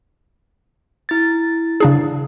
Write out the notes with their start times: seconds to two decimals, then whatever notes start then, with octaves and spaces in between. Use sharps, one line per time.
1.09 E4 A6
1.80 C#3 D4 G#4